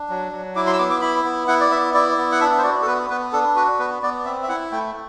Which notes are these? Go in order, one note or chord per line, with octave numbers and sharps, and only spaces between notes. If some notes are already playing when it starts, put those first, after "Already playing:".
Already playing: D4
F#3
F#3
E4 D6
C6
E6
B3 D6
D6
E4 B5
B3
E4 F#5
D5
B3 E5
E4 D5
B3
F#5
D4 E5
C5
F#4 D5
A4
B3 B4
B3 B4
D4 A4
F#4 B4
B3 B4
B3 D5
C4 E5
E5
E4 F#5
A3 G5